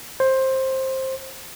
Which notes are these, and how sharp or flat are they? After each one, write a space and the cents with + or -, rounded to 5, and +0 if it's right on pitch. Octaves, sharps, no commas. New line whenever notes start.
C5 +15